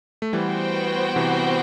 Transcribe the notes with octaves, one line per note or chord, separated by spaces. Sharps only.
A3
E3 G3 B3 F#4 C5 G5
C3 E3